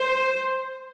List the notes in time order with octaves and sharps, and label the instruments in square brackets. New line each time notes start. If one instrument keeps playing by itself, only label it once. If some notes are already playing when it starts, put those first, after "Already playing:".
Already playing: [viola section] C5